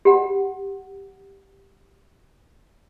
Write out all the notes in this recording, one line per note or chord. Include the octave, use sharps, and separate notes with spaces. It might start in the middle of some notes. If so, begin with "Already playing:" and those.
G4 F#5